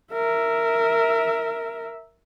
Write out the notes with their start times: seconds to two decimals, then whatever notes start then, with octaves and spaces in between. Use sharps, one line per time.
0.13 A#4 E5